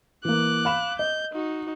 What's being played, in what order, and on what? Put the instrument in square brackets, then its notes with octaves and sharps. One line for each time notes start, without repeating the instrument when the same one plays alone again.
[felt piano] E3 A#3 [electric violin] D6 F#6
[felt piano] F5 B5 E7
[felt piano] D#5 [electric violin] G6
[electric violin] D#4 F#4